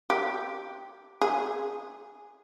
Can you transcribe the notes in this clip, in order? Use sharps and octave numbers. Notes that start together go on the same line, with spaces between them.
G4
G#4